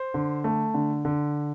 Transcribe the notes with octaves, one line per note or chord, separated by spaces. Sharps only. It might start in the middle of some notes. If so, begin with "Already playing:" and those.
Already playing: C5
D3
A3
D3
D3